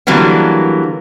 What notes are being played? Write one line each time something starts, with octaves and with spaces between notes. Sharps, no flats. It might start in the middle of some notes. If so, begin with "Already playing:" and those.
D3 E3 F#3 G3 A#3 B3